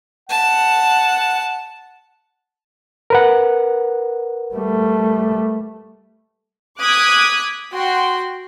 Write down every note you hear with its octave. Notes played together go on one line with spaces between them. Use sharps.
F#5 A5
A#4 B4 F#5
G3 A3
D6 D#6 F#6 G#6 B6
F#4 G5 C6